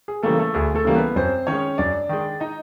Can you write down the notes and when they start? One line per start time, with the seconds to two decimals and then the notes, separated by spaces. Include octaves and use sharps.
0.08 G#4
0.23 C#3 E3 G3 A3 A#3 A4
0.39 A3 A4
0.54 D2 G#4
0.74 A3 A4
0.85 C#3 E3 G3 A#3
0.95 B3 B4
1.16 F#2 C4 C5
1.47 D#3 G#3 C#4 C#5
1.78 F#2 D4 D5
2.09 D#3 G#3
2.40 D#4 D#5